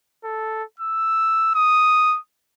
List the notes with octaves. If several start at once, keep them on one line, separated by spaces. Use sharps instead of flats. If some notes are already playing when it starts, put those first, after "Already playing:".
A4
E6
D#6